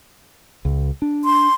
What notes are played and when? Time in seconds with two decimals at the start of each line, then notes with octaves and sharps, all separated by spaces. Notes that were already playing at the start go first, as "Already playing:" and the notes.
0.65 C#2
1.02 D4
1.25 C6